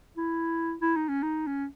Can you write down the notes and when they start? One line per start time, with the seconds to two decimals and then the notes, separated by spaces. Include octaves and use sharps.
0.17 E4
0.82 E4
0.96 D#4
1.09 C#4
1.23 D#4
1.47 C#4